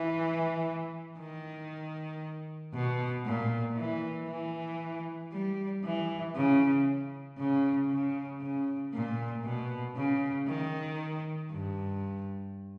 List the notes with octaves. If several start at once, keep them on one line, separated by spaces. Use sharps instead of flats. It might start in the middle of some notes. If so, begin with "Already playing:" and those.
Already playing: E3
D#3
B2
A#2
E3
E3
G3
E3
C#3
C#3
C#3
C#3
A#2
B2
C#3
D#3
G2